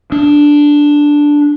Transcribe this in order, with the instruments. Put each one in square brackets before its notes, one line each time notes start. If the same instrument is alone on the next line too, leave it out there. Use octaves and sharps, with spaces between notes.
[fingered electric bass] D4